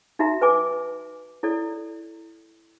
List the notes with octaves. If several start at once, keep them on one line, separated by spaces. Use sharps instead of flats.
D#4 F#4 E5 A#5
B4 G#5 D6
E4 A4 D5